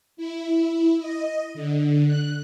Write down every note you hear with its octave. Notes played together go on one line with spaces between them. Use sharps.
E4
D#5
D3
F#6